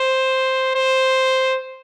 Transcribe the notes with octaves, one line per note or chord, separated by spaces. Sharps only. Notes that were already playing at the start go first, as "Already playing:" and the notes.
Already playing: C5
C5